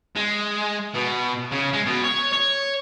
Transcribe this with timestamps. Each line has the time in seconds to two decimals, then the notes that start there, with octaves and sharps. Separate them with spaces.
0.16 G#3
0.94 B2
1.51 C#3
1.73 G#3
1.85 B2
2.04 C#5
2.33 C#5